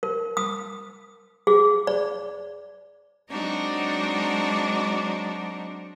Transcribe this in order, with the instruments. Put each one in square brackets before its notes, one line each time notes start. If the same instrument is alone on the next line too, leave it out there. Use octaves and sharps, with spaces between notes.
[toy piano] A#4
D#6
G#4
D5
[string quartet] F#3 G#3 C4 D4 D#4 F#4